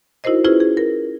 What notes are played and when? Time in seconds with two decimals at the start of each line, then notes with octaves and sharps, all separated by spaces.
0.24 D#4 E4 F#4 A#4 C5 D#5
0.44 C#4 E4 F4 G#4 B4 C5
0.60 G#4
0.77 A#4